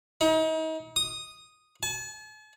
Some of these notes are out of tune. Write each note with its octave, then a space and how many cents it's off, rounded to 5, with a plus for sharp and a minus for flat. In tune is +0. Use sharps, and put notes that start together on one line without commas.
D#4 +35
D#6 -5
A5 -45